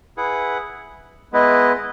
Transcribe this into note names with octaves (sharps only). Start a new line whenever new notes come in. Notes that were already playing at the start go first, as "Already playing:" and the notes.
E4 G#4 B4 F#5
G#3 B3 E4 B4 D#5